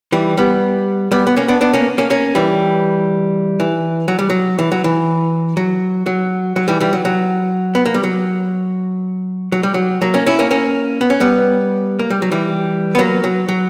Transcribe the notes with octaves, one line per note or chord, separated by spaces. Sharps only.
E3 G3
G3 B3
G3 B3
B3
A#3 C#4
B3 D4
B3 D4
A#3 C#4
A#3 C#4
A#3 C#4
E3 G3
E3
F#3
G3
F#3
E3
F#3
E3
F#3
F#3
F#3
E3 G3
E3 G3
F#3
F#3
B3
A#3
G3
F#3
F#3
G3
F#3
F#3 A#3
A#3 C#4
C#4 E4
A#3 C#4
A#3 C#4
B3
C#4
G3 B3
A#3
G3
F#3
E3 G3
B3
F#3 A#3
F#3
F#3